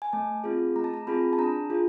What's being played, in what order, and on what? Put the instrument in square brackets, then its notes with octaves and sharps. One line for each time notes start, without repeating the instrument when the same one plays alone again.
[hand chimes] G#5
A3 A5
C4 F4 G#4
A3 A#5
A5
A#5
C4 F4 G#4 B5
A5
D4 A#5
F4 G#4